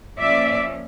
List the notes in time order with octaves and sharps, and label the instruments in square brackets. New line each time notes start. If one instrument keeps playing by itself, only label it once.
[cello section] F3 A#3 C#4 D5 E5